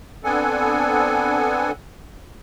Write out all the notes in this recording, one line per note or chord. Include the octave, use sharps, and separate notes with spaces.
B3 C4 D4 A4 F#5 G#5